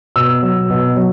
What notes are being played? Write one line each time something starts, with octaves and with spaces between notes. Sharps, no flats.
B2 E6
F#3
B2
F#3